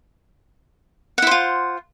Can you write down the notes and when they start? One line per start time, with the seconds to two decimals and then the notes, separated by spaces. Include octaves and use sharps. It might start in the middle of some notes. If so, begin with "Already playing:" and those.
1.18 F#5
1.22 E4
1.27 C5
1.31 F4